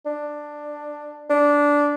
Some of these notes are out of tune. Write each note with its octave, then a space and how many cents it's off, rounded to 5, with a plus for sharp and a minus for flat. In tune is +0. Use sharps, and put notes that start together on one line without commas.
D4 +10
D4 -10